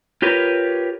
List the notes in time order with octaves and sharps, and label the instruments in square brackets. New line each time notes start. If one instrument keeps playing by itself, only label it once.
[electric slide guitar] F4 G4 A#4 B4 C#5